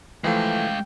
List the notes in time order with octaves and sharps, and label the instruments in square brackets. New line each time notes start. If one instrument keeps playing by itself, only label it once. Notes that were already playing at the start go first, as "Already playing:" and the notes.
[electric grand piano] E3 F3 A3 [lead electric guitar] G#3 F5 [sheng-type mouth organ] G5